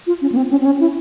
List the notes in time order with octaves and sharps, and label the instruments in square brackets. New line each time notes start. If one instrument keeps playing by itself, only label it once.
[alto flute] F4
C#4
A#3
C4
C#4
C4
C#4
E4